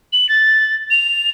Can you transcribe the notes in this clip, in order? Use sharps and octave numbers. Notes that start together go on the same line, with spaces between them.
F#7
A6
F7